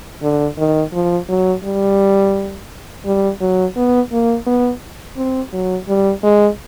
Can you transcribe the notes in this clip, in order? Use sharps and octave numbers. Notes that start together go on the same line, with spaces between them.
D3
D#3
F3
F#3
G3
G3
F#3
B3
A#3
B3
C4
F#3
G3
G#3